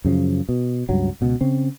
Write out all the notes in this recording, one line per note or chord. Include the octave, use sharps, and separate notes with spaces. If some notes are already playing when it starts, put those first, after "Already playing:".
F#2 C#3 F3
B2
C#2 G2 F#3
C#2 B2
C#3 C4